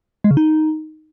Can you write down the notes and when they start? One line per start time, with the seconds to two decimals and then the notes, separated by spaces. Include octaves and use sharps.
0.24 G#3
0.31 C#3
0.37 D#4